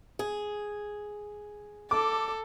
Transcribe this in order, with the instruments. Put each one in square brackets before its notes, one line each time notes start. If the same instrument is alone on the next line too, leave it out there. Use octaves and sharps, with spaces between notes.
[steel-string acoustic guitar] G#4
[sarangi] A4 [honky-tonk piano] D6